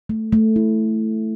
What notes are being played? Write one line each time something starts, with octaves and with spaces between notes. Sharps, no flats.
A3
A3
E4